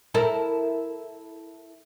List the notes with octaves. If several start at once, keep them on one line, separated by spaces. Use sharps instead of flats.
E4 A4 A#4